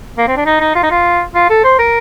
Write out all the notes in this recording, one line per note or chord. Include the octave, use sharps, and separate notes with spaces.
A#3
C4
D4
D#4
D#4
F4
D#4
F4
F4
A4
C5
A#4